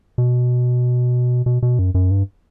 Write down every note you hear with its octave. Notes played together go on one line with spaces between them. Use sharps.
B2
B2
B2
F#2
F#2
G2